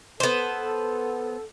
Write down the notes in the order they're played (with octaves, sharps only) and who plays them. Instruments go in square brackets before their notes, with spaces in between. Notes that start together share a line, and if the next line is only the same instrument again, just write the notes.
[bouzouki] B3 C5 [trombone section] A4